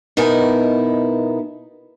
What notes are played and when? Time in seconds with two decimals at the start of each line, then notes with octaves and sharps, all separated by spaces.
0.17 B2 B3 D#4 E4 A#4 G#5